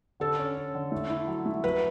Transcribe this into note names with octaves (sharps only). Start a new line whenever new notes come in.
D3 A4
C#4
C#4
D3
A3
E4
F#3
A3
F#3 B4